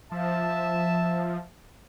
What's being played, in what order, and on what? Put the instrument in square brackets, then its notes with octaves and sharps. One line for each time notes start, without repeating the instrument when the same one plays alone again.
[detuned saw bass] F3 [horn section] E5 A5